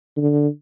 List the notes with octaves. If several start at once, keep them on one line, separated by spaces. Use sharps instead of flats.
D3